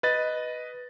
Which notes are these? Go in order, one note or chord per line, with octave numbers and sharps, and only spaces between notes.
B4 D#5 A6